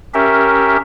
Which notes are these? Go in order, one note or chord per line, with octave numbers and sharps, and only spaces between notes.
C#4 G4 A#4 E5